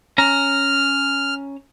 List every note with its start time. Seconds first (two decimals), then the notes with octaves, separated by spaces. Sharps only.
0.18 C#4 A#5 F6